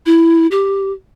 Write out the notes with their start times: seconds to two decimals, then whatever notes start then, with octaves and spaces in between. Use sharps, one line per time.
0.06 E4
0.51 G4